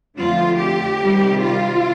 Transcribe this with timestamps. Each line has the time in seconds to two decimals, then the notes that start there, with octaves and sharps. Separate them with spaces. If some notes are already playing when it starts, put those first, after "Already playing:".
0.17 F2 D3 A3 F4
0.58 G4
1.01 C3 D#3 G3
1.42 F4